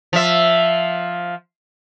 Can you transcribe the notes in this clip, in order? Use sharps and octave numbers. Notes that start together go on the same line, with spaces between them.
F3 E5